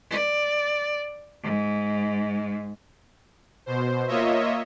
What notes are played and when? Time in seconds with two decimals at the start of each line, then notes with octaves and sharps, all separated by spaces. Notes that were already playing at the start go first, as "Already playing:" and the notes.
0.11 D5
1.43 G#2
3.66 B2 C5
4.07 A#3 F4 C#5 D#5 E5